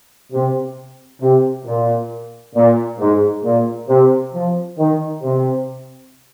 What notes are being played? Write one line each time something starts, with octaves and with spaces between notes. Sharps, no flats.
C3
C3
A#2
A#2
G#2
A#2
C3
F3
D#3
C3